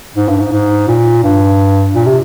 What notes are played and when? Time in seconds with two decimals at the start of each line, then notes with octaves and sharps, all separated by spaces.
0.16 G#2
0.28 G2
0.39 G#2
0.52 G#2
0.88 A#2
1.23 G2
1.94 A#2
2.06 C3